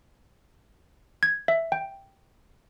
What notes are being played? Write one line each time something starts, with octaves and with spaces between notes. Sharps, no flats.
G#6
E5
G5